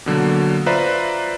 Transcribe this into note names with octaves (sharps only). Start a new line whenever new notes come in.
B2 D3 F#3 A#3
F4 B4 C5 D5 E5 A#5